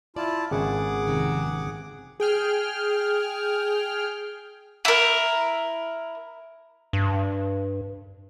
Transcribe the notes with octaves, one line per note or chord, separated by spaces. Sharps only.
E4 F4 D5 A5
G#1 C#3 G#4 F#5 G#5 D6
F2 C3 D#3
G#4 G5 F6
E4 A#4
G2